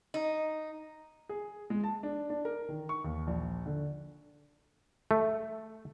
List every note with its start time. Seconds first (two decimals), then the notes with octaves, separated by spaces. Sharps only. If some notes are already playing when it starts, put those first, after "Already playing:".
0.14 D#4
1.29 G#4
1.70 G#3
1.84 A5
2.03 D4
2.30 D4
2.45 A#4
2.69 D#3
2.89 C#6
3.04 D#2
3.27 A#1
3.66 D3
5.11 A3